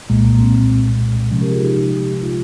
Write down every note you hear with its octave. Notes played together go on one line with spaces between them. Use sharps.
C2 A#2 G#3 A#3
A#3
A#3
C4
C4
C3 F3 G#3 C#4
G4 A#4
F4 G#4
D#4 G4
D#4
D#4 G4
F4